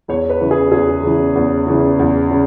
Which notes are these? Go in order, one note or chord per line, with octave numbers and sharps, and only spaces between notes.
E2 C#5
B4
C#3 E3
G#4
E2 G#4
C#3 E3
E2
C#3 E3
E2
C#3